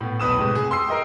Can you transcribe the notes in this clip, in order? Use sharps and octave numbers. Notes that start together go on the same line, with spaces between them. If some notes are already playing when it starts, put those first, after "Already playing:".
A2 B3
B1 E2 B4 D#6 E7
A2 C3 G#3
G#4
C6 E6 C7
A#4 D#5 G5